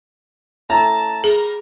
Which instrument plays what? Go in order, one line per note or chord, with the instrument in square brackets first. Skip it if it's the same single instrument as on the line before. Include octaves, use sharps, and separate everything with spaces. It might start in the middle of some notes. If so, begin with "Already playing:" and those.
[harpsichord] A3 C#4 E4 [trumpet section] A5 [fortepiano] A#5
[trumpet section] G3 A#4 [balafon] G#4